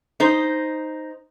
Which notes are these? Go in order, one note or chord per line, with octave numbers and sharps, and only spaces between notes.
D#4 C5